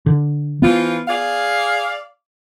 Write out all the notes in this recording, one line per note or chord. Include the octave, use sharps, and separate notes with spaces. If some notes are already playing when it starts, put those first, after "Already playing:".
D3
E3 F3 B3 F4
G#4 D5 F5